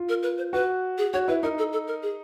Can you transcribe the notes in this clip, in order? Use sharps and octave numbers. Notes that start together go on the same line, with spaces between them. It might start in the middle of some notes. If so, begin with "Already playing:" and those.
Already playing: F4
A#4
B4
C5
F#4 B4
G#4
F#4 C#5
E4 B4
D#4 A#4
A4
A4
A#4
G#4